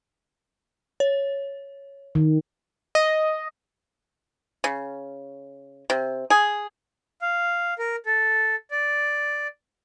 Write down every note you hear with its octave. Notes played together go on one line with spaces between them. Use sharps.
C#5
D#3
D#5
C#3
C3
G#4
F5
A#4
A4
D5